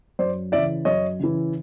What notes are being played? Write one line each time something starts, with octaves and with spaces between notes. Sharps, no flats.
F#2 C5 D5
C#3 E3 D5 E5
F#2 C#5 D#5
C#3 E3